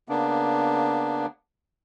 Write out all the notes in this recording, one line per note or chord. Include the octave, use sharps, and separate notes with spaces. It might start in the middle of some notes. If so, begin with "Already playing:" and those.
C#3 A#3 B3 D4